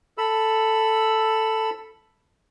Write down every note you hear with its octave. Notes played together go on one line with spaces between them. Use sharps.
A4 B5 E6